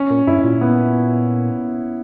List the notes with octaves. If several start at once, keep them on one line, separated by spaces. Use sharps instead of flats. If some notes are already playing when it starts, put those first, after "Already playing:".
Already playing: C#4
A#2
G2 E4
A#2
B3